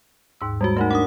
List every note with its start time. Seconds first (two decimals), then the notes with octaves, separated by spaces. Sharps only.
0.41 D#2 G#2 E6
0.61 G3 G#3 F#4
0.77 A3 D#4 A#4 F#5
0.91 D4 A#4 F#5 D#6